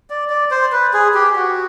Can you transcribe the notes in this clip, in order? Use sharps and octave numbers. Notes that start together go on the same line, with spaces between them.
D5
D5
C5
B4
G#4
G4
F#4